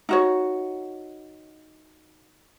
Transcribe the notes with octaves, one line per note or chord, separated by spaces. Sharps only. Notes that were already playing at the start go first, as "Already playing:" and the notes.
D#4 F#4 C#5